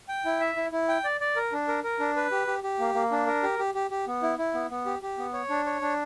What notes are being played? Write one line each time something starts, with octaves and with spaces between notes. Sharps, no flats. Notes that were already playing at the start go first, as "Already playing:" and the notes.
G5
E4
E5
E4
E4
G5
D5
D5
A#4
D4
A#4
A#4
D4
B4
G4
G4
G4
A#3
A#3
D4
A#4
G4
G4
G4
G4
B3
E4
E4
B3
B3
G4
G4
B3
C#5
D4
C#5
D4